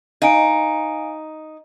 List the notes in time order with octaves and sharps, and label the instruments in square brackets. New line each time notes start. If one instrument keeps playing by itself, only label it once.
[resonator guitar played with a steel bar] D#4 [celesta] F5 G#5 D7